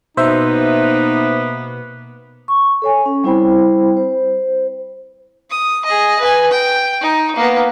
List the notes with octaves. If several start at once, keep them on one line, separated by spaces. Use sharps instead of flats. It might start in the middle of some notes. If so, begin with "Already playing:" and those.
B2 A#3 B3 D#4 B4 C5 E5
C#6
A4 C#5 G#5
C#4
G3 C4 E4 C5 G5 B5
C5
D#6
G#4 D#5
B4 G#5
G5
D#4
A#3 B3